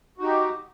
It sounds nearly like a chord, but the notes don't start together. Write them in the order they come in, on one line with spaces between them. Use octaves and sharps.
F#4 D#4 G4